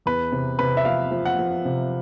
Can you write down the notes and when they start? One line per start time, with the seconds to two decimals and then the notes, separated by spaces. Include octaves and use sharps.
0.06 E2 B4
0.32 C3
0.59 C3 B4
0.77 E5
0.85 F3 F5
1.12 F3
1.26 F#5
1.39 F3
1.65 C3